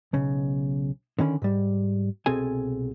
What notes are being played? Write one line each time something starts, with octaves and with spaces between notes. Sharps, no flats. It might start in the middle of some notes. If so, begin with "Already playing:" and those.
B1 C#3
D3 D#3 C#4 B5
G#2 G3
C2 B2 C4 G#4 A4 G#5